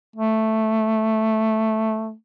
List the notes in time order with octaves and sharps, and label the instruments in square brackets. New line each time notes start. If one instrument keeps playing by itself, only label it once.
[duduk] A3